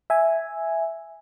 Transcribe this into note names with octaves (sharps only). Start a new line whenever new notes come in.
E5 G#5